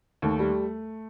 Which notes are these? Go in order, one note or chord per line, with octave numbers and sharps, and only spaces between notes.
D#2 A3
G3